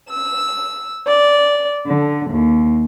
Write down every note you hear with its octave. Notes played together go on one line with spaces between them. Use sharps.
E6
D5
D3
D#2